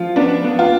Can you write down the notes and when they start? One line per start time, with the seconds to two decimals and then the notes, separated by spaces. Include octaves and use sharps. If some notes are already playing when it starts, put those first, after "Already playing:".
Already playing: F3 F4
0.16 B3 D4
0.44 B3
0.59 F4